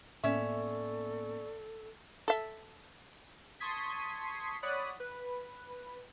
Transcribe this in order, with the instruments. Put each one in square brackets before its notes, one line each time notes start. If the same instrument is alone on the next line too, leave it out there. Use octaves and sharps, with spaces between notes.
[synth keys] A2 A#3 B3 [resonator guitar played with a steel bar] C#4 E5 [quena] A4 [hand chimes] D5 C#6
[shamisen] A4 E5
[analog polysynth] A5 C6 C#6 D#6 G#6 B6
C#5 D5 F#5 B5 D#6 F#6
B4